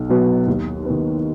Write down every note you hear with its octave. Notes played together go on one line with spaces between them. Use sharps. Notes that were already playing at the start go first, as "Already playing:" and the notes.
Already playing: B1
B2 F#3 B3
D#2
B3
D#3